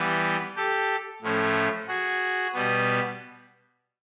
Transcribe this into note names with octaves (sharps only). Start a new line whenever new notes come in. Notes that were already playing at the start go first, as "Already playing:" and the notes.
Already playing: E3 G3 B3
G4 A4
A2 F3 A3 C#4
F#4 G#4
B2 G3 B3